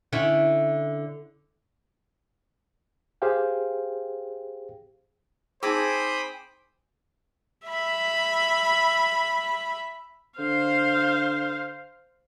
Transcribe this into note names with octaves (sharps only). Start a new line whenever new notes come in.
D3 C#4 E4
G4 G#4 C5 F5 G5
C4 D#4 G#4 C5 G#5 B5 D6 D#6
E5 B5
D3 C5 F5